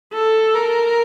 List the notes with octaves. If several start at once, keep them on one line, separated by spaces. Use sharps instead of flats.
A4
A#4